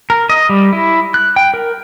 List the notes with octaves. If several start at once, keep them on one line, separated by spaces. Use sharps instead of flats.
A#4
D#5
G3
E4
F#6
G5
A#4